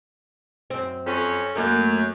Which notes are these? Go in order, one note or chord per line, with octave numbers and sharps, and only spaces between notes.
F#2 C4
F2 C#4
F#2 A3 A#3